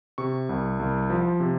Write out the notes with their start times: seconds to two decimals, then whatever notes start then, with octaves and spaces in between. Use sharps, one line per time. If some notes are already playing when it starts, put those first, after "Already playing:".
0.18 C3 C#6
0.49 C2
0.79 C2
1.10 F3
1.40 C3